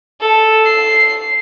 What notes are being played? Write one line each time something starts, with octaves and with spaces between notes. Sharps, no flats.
A4
C7